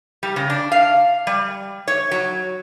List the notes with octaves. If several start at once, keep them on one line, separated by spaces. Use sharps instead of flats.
G3
C#3
D4
F5
G3
C#5
F#3